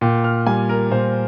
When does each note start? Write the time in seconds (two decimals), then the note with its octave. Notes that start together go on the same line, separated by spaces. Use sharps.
0.01 A#2 G5
0.24 F6
0.46 G3 G#5
0.69 A#4
0.91 A#2 C5